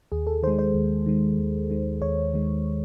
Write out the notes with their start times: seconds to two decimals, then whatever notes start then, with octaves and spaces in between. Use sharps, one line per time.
0.12 D#2 G#4
0.27 A4
0.43 D#3 G#3 C5
0.59 C5
0.74 D#2
1.06 D#3 G#3
1.38 D#2
1.70 D#3 G#3
2.02 D#2 C#5
2.34 D#3 G#3